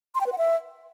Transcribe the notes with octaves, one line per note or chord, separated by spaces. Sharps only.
C6
G5
B4
F#5
E5